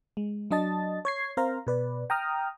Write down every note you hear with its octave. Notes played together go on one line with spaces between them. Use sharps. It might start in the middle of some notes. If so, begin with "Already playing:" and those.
G#3
F#3 D4 D#5 A5 A6
C#5 G#6 C7
C4 A#4 C5 F5 A#5
B2 B4 D5
G5 A#5 D#6 F6